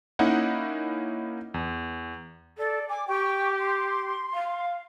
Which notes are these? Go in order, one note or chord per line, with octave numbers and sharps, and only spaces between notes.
A#3 C#4 D#4 E4 F#5
E2
A4 D5
G#5 D6
G4 G5 C#6
C6
F5